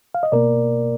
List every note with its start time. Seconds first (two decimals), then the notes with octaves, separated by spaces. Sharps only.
0.15 F5
0.23 D#5
0.32 B2 A#3 A#4 D5